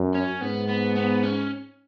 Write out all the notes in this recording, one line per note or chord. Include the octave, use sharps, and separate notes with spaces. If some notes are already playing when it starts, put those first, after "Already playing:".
Already playing: F#2
C#4
G#2 B3
B3
B3
C#4